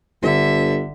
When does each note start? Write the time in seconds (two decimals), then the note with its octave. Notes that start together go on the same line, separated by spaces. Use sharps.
0.22 G1 D3 E5